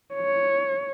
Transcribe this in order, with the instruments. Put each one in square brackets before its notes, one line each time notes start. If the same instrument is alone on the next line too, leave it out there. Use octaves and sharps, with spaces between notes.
[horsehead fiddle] C#5